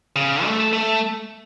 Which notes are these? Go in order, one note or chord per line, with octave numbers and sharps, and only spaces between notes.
C#3
A3
A3